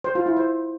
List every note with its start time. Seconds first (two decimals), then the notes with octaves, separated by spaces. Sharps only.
0.04 C5
0.15 F4
0.26 E4
0.37 C5